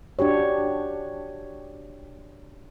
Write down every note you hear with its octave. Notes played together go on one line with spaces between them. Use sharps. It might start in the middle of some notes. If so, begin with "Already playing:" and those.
D4 F#4 G4 C#5